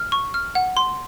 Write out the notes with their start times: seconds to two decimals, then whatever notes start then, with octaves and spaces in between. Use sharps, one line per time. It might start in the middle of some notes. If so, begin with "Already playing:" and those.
Already playing: F6
0.12 C#6
0.34 F6
0.55 F#5
0.77 C6